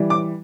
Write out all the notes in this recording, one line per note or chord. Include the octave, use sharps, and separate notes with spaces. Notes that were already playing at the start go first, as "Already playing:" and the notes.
Already playing: E3 G3
D6